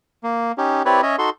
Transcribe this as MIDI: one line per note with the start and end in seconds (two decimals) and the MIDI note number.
0.23 0.52 58
0.58 0.82 61
0.58 0.82 63
0.58 0.82 67
0.85 1.01 60
0.85 1.01 64
0.85 1.01 67
0.85 1.01 71
0.85 1.01 73
0.85 1.01 74
1.03 1.16 61
1.03 1.16 73
1.03 1.16 75
1.03 1.16 76
1.18 1.30 63
1.18 1.30 66
1.18 1.30 69
1.18 1.30 84